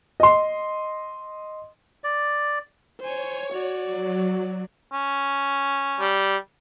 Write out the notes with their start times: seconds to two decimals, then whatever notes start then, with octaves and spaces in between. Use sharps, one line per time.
0.20 D#5 C6
2.04 D5
3.00 C5 C#5 G#5
3.52 F#4 D5
3.84 F#3
4.93 C#4
6.00 G3